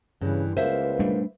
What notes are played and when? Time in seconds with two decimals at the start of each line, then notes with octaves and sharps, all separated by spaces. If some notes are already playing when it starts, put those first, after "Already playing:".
0.21 G2 C#3 E3
0.57 C#2 A#3 B3 C5 E5
0.99 G3 A3 D4